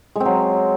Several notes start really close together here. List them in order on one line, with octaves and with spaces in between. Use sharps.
G#3 C4 F#3